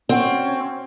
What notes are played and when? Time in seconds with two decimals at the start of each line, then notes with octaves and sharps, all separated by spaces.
0.09 C4 C#4 F#4 F#5 G5